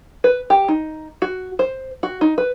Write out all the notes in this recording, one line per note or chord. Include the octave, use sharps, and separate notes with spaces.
B4
G4
D#4
F#4
C5
F#4
D#4
B4